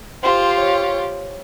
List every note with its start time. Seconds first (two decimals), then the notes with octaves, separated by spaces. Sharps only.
0.23 F4 G4 C5
0.59 C#5